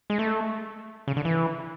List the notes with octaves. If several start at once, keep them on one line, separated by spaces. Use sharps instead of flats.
G#3
A3
C#3
D3
E3